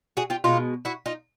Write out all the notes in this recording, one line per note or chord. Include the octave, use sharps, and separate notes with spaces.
F#4 G#4
F4 G4
B2 G#3 D#4 F4
E4 F#4
D#4 F4